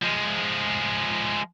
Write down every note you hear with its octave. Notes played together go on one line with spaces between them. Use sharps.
F3 G#3